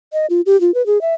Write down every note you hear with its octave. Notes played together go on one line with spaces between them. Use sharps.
D#5
F4
G4
F4
B4
G#4
E5